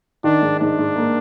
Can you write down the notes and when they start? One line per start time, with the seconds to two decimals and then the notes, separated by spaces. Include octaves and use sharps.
0.24 D#3 D4
0.42 G#2
0.60 G#2 D4
0.78 G#2
0.96 A#3